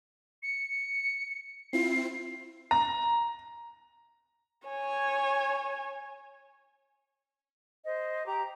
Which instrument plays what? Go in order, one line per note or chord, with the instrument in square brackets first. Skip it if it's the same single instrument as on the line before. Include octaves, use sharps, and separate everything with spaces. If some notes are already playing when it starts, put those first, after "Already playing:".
[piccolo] C#7
[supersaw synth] C4 E4 F4 [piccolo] C7
[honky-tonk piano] A#5
[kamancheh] C#5 G#5
[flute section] C5 D#5
G4 A#5 D6